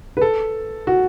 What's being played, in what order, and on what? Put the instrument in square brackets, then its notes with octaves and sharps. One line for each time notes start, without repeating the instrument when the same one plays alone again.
[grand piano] B4
A4
F#4